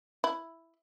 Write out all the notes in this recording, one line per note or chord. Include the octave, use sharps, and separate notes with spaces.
E4